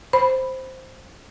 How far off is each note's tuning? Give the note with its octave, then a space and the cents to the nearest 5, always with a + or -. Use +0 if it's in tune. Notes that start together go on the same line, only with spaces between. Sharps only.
C5 +0 B5 +0